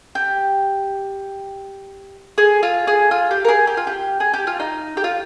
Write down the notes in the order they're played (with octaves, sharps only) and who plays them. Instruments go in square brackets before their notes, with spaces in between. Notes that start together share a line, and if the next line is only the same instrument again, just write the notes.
[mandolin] G4
G#4
F4
G#4
F4
G4
A#4
G#4
G4
F4
G4
G#4
G4
F4
D#4
G4
F4